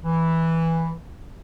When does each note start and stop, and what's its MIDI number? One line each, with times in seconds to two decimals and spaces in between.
0.04 0.93 52